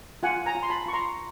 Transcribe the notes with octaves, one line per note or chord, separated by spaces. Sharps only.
F4 F#5 G#5
G#5 A#5
F4
C6
A5 B5
F4 C#6
A#5 C6